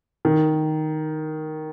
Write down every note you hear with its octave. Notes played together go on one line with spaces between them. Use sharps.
D#3